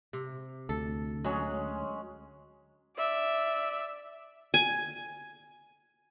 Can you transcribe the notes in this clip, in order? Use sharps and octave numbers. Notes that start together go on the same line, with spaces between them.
C3
D2 A4
F#3 G#3 C#4 G#4
D5 E5
G#5